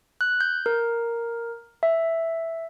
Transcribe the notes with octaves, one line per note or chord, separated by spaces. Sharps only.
F#6
G6
A#4
E5